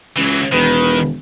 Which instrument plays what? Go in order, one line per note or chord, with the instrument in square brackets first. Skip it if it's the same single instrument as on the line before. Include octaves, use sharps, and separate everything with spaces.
[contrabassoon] C#2 [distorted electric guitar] E3 F#3
[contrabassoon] E1 [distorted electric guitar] D#3 [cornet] B4